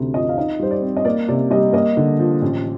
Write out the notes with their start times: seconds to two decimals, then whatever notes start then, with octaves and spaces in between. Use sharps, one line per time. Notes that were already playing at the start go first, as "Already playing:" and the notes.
Already playing: D2 C3
0.14 F3 D#5
0.29 F5
0.37 D#4 D#5
0.59 G3 C5
0.71 D5
0.82 C4
0.97 D#5
1.05 A#3 D5
1.28 C3 D5
1.50 G3 D#5
1.73 A#3 D#5
1.97 D3
2.19 F3
2.42 A1